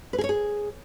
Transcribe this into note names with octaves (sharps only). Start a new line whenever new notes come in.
B4
G#4
C#5
G#4